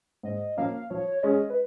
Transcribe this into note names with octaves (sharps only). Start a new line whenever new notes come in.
G#2 D#5
F3 A#3 C#4 F5
F3 C#5
C#5
G#3 C#4 G#4 D#5
B4